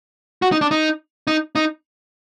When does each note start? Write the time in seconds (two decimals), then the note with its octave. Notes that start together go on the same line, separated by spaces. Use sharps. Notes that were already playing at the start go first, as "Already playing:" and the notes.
0.42 F#4
0.52 D#4
0.61 D4
0.71 D#4
1.27 D#4
1.55 D#4